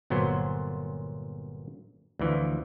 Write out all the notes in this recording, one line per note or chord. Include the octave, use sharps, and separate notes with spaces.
G1 A#2 F#3 B3 C5
D2 E3 F3